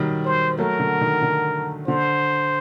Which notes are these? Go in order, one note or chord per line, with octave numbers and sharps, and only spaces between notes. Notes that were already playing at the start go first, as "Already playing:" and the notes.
Already playing: D#3 F#3 G3
C5
F#3 A3 A#4
D3 F#3
D#3
D3
D3 C5